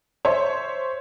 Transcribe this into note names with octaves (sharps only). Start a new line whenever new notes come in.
C5 C#5 E5 C6